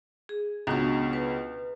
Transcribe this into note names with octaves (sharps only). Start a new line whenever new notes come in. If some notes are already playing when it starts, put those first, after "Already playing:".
G#4
C#2 B2 D4 C#6
B4